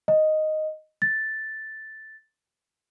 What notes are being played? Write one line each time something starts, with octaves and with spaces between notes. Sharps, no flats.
D#5
A6